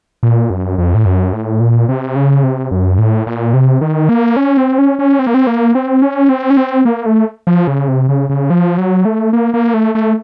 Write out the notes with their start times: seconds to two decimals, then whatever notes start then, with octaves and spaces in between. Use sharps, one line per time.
0.23 A#2
0.50 F#2
0.78 F2
0.95 A2
1.06 F#2
1.33 A2
1.60 A#2
1.89 C3
2.16 C#3
2.43 C3
2.71 F#2
2.98 A2
3.27 A#2
3.54 C3
3.81 D#3
4.09 A#3
4.37 C#4
4.57 C4
4.78 C#4
4.99 C#4
5.19 C4
5.27 A#3
5.34 C4
5.47 A#3
5.75 C4
6.02 C#4
6.29 C4
6.50 C#4
6.57 C4
6.85 A#3
7.06 A3
7.47 F3
7.67 C#3
7.88 C3
8.09 C#3
8.29 C#3
8.50 F3
8.78 F#3
9.05 A3
9.33 A#3
9.54 A#3
9.74 A3
9.95 A3